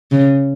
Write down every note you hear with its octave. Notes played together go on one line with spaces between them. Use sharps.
C#3